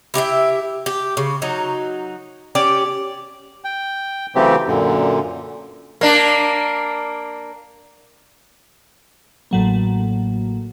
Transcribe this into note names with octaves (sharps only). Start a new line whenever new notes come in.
E4 G4 D#5 E5
G4
C#3
F#3 D#4
C#4 G4 D5
G5
C#3 E3 F#3 A3 C4 G4
F#2 A#2 D3
A#3 D4
A1 A2 F#3 A#3